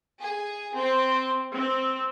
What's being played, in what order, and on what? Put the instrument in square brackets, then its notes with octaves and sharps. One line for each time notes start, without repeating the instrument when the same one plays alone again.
[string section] G#4
C4
C4